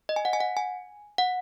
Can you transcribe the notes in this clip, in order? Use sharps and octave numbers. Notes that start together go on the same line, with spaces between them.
D#5
G#5
F#5
G#5
F#5
G#5
F#5